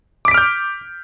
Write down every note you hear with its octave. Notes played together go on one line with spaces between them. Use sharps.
D6 F6 G6 B6 D7